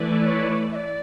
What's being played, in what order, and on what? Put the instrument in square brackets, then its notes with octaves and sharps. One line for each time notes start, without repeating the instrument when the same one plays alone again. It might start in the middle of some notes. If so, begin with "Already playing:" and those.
Already playing: [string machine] E3 A3 E4 B4 D5
[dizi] C#5
E5
D5